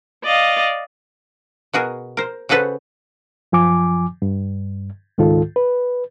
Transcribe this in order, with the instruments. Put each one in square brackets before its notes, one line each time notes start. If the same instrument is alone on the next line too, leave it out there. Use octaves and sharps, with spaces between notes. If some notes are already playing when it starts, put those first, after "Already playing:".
[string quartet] D5 D#5 F5
[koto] B2 F#4 G#4 A#4
A#4 C5
C#3 F#4 G#4 A4 B4 C5
[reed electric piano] F#2 F3 G#5 D6
G2
C#2 G#2 D#3 F4 A4
B4